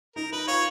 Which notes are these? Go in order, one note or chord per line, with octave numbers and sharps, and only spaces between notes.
D#4 A#4
D#4 B4
F4 C#5